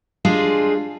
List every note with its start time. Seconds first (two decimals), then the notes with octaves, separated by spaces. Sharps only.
0.25 G3 G#3 D4 F4 G#4